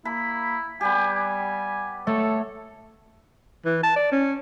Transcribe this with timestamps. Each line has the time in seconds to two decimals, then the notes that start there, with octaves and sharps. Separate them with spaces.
0.05 A#3 E4 B5
0.81 G3 B3 G4 G#5
1.16 G#5
2.07 A3 A4 C#5
3.65 E3
3.83 A5
3.96 D5
4.12 C#4